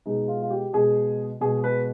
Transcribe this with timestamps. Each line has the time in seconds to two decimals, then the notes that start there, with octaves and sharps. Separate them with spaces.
0.06 B2 G#3 D#4
0.28 F4
0.42 F4
0.50 G4
0.73 B2 G#3 G#4
1.41 B2 G#3 G#4
1.64 B4